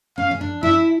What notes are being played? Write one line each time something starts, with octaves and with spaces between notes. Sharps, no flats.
C#4 F5
C#4
D4
E4 E5